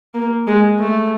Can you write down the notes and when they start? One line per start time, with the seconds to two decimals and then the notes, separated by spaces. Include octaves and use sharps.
0.14 A#3
0.47 G#3
0.79 A3